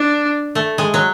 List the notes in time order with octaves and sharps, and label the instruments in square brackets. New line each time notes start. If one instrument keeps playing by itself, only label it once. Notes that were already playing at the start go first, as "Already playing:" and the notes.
Already playing: [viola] D4
[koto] A3
G#3
F#3